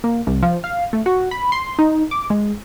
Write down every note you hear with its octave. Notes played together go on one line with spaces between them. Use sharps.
A#3
C2
F3
F5
A3
F#4
B5
C6
D#4
D6
G#3